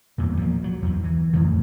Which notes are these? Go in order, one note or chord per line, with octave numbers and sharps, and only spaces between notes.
E2 G2 A#2
F3 A#3
F#3
E2 G2
E3
F2 A2 C#3